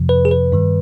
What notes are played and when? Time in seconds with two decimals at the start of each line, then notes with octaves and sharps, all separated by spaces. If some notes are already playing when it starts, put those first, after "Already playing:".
Already playing: F2 C3 F3
0.09 B4
0.25 G#4
0.31 B4
0.52 G2 D#3 G3